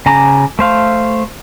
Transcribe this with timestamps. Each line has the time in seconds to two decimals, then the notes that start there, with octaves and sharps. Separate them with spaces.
0.06 C#3 G#5 A#5 D6
0.59 A3 C5 F5